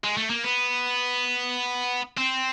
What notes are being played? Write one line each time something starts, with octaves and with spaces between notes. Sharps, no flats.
G#3
A3
A#3
B3
C4